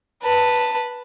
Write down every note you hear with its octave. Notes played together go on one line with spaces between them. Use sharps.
B4 A5